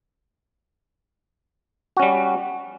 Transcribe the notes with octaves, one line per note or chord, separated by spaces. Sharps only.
G3 C#4 F#4